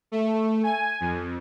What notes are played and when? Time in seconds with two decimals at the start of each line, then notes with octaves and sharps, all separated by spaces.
0.12 A3
0.64 G#5
1.00 F2